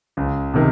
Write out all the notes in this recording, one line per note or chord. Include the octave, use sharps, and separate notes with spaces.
C#2
C3 D#3